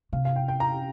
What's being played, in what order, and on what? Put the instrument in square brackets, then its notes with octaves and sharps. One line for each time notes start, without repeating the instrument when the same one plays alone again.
[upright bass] C3 [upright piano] F5
[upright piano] F5
G5
G5
A#5